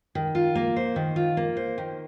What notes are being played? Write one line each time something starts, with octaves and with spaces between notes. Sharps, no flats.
D#3
F4
A#3
C5
D#3
F4
A#3
C5
D#3